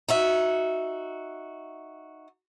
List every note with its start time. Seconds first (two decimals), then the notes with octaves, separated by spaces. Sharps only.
0.09 D#4 F#4 E5